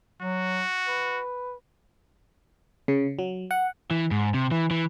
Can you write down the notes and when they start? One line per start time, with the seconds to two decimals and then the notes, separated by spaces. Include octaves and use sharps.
0.22 F#3 F#4
0.86 B4
2.88 C#3
3.19 F#3
3.51 F#5
3.91 E3
4.11 G#2
4.34 C3
4.51 E3
4.71 E3